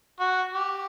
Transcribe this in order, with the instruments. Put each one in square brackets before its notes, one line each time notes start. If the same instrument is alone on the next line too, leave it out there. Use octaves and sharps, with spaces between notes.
[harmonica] F#4
G4